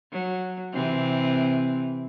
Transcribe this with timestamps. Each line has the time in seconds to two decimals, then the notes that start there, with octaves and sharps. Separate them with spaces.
0.13 F#3
0.73 C3 E3 C4